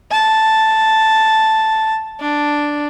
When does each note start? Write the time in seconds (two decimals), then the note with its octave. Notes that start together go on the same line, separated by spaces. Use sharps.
0.12 A5
2.21 D4